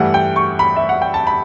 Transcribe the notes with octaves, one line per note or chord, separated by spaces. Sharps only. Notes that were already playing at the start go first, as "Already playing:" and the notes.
Already playing: G2 E3 A3 F#5
G5
C#6
B5
E5
F#5
G5
A5
B5